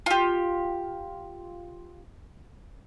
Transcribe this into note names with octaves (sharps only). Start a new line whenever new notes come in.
F4 G4